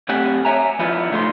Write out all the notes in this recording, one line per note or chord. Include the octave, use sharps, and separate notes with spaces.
B1 A3 C4 G4 F#5 G#5
C#5 E5 G#5 A#5
F3 B3 E4 F4
C#3 A3 D#4 A4 C5 C6